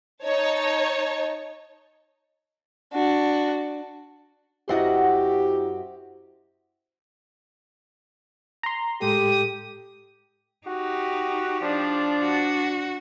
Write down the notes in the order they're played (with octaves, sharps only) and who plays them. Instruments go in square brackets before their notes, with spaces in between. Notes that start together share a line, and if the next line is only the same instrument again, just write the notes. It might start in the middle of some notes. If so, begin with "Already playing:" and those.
[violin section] D#4 C#5 A5
[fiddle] D4 F#4
[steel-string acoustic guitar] F#2 F#4 D#5 [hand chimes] E4 E5 [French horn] G4 [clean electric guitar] C5 F#5
[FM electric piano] A#5 C6
[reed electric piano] A2 G#3 A4 [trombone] G4 [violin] D#6
[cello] D#4 G4 [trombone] F#4
[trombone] F3 [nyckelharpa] D4 D5
[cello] F#4